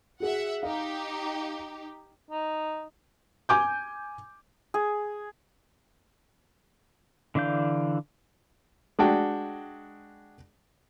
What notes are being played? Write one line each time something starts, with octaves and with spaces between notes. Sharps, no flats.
F#4 G#4 E5 F#5
D#4 G4 F5
D#4
G#5 D6 G6
G#4
D3 E3 D4 F5 G6
G#3 D4 F#4 G5